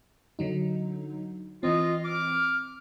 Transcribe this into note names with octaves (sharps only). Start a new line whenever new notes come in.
D3 F#3 D#4
E3 C4 F4 D#5
D6 F6